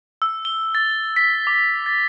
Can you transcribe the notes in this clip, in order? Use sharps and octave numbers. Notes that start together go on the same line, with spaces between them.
E6
G7
A6
B6
D6
A6